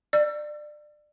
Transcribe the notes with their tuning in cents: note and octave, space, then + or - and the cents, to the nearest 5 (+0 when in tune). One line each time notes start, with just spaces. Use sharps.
D5 +25 E6 +40